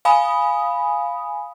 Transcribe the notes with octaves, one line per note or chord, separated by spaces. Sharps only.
F5 G#5 B5 D#6